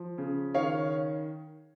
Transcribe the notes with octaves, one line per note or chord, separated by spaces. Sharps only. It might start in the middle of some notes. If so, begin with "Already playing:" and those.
Already playing: F3
C#3
D#3 C#5 F5